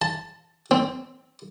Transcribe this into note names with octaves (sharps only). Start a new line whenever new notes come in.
A5
C4